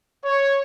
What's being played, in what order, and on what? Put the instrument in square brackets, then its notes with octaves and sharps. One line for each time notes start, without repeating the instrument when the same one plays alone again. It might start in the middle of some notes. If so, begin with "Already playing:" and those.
[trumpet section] C#5